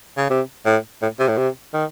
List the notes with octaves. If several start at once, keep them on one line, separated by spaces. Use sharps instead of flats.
C#3
C3
A2
A2
C3
A2
C3
D#3